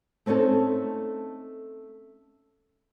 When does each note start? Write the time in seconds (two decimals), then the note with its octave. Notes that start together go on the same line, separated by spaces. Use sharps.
0.26 A3 C4 C#4 D#4 A4